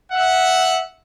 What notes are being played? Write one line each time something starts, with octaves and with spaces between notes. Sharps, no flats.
E5 F#5